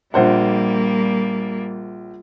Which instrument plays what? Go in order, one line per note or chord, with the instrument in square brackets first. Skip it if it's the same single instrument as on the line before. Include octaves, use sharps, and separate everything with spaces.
[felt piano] A#1 C5 F#5 [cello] G3 A#3